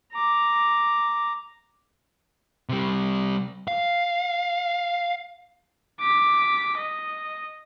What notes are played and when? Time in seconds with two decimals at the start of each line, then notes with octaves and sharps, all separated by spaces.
0.12 A#5 D6
2.69 C3 G3
3.68 F5
6.01 D6 B6
6.78 D#5